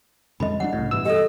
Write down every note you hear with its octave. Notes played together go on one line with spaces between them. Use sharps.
F2 D3 G#3 D#5 B5
F#3 B3 D4 F#5
C2 A2 C#3
G2 B2 E3 E6
G4 A4 D#5